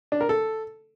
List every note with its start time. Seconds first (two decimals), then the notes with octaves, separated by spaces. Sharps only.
0.12 D4
0.21 A#4
0.29 A4